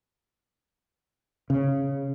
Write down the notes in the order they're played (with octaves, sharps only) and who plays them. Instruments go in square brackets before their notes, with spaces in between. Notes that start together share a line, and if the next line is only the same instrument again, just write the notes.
[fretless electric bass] C#3